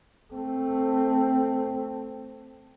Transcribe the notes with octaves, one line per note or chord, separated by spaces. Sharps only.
A3 C4